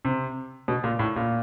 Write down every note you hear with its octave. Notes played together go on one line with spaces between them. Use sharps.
C3
B2
A#2
A2
A#2